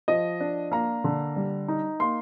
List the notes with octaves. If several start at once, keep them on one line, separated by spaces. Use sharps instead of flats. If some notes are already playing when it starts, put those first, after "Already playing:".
F3 D#5
D4
A#3 A#5
D3
G3
D#4
A#3 C6